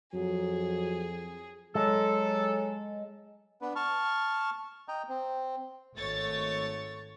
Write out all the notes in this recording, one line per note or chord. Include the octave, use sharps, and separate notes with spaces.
F2 F#3 G#4
F#3 G#3 A4
B3 D4 B4
A5 C#6 F6
D#5 G5 A#5
C4
G#1 A3 C#5 C#6 A6